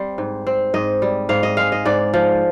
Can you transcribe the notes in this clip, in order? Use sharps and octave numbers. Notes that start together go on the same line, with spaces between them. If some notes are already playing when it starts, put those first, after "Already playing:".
Already playing: G3 C4 C5
G#2
C4
G#2 D#5
G3
G#2 F5
D#5
G#3 F5
D#5
G#2 D5
F3